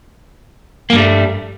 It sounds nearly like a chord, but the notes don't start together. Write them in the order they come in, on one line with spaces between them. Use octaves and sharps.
A#3 G2 G3 A3